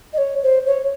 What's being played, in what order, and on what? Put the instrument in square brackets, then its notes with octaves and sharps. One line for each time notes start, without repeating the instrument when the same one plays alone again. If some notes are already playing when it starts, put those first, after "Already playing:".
[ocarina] D#5
C#5
C5
C#5